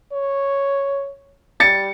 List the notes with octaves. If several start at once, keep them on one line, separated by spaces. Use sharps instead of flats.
C#5
G3 A6 C#7